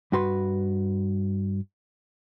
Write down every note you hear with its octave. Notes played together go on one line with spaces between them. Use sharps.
G2 F#4 B4 C6